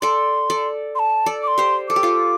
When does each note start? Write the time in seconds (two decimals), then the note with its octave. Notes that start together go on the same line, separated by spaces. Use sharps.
0.02 A4 D5 C6
0.50 A4 D5
0.95 C6
0.99 A5
1.26 A4 D5
1.43 D6
1.48 C6
1.58 G4 C5
1.89 A4 D6
1.96 G4
2.03 F4 A4